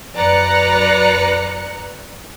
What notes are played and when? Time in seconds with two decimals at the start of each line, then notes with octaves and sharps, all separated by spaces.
0.15 F#2 B4 D5 A#5 F#6 C#7